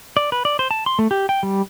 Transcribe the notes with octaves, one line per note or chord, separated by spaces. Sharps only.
D5
B4
D5
C5
A5
C6
A3
G4
G5
G3